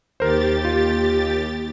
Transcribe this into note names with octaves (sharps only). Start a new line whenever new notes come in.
D#2 G4 A#4 C5 A6
F4